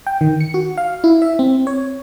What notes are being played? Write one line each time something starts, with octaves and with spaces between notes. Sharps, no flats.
G5
D#3
C#7
F#4
F5
E4
E5
C4
C#5